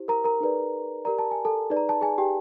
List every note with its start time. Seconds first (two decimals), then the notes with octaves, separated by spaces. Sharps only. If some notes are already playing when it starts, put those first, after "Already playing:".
Already playing: E4 G4 C5
0.08 A#4 A#5
0.24 A#4 A#5
0.41 D#4 G#4 B4 D5
1.05 G4 A#4 D5 A#5
1.19 A5
1.31 G#5
1.45 A4 A5
1.70 D#4 G#4 B4 D5
1.77 A#5
1.89 A5
2.01 G#4 G#5
2.18 G4 G5